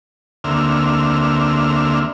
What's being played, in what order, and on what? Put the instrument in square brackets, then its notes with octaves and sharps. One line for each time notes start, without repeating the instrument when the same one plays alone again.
[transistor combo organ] D2 D3 A#3 C4 E5 F6